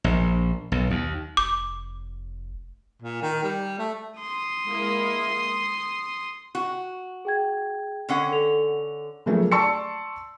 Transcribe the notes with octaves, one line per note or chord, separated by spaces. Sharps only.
A#1
B1
D#2
F1 D6
A#2
D#3
G3
A3
C6 D#6
G#3 A#3 E4
C7
F#4
G#4 G5 G#6
D3 C#4 F#5
A4 F7
C#3 F3 F#3 A3 A#3
D5 A5 C6 C#6 E6 C#7